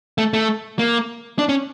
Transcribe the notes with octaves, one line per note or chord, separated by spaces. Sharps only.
A3
A3
A#3
D4
C#4